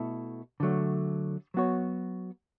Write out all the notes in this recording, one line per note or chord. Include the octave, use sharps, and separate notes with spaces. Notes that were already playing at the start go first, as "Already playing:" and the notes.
Already playing: B2 A3 E4 A4
D3 F#3 A3
F#3 B3 F#4 C#5